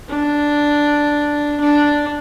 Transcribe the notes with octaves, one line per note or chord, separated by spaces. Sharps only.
D4
D4